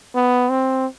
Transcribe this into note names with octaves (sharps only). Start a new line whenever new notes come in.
B3
C4